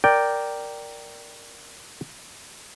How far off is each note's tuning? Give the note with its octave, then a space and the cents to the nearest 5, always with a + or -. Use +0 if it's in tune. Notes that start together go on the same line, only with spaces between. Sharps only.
A#4 +0 D5 +0 G5 +0